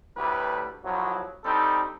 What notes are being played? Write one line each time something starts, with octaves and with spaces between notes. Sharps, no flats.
D2 A2 G3 G4 B4
C2 F3 F#3
G3 C4 D4 D#4 A4